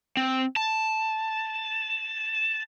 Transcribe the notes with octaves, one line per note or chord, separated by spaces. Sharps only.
C4
A5